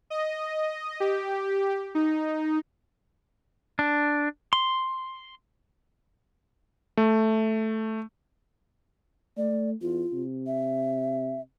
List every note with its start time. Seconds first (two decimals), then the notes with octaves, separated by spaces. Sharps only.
0.10 D#5
1.00 G4
1.95 D#4
3.79 D4
4.53 C6
6.97 A3
9.37 A3 D5
9.81 E2 F4
10.12 C3
10.47 E5